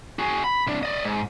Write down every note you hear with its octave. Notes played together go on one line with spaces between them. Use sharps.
F#4 G#4
B5
C2 D4
D5 D#5
G#2